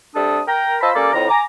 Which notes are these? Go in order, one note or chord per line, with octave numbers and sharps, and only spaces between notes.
C3 G3 D4 A4 D#6
A#4 G5 A#5
F4 C5 D#5 A5 B5 E6
G3 A#3 C#4 A4 D5
F2 A2 A#5
G#5 A#5 D6